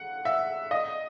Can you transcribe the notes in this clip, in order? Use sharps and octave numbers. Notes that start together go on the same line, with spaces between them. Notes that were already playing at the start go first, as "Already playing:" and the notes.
Already playing: F#5
E5
D#5